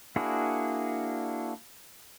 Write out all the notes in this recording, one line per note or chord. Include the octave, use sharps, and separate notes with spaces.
A#3 D4 E4 F#4 G#4